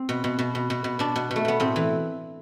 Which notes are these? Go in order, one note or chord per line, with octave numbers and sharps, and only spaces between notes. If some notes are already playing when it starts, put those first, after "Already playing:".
Already playing: C4
B2
B2
B2
B2
B2
B2
B2 D4
B2
B2
A3
B2 B3
A2 C4
E3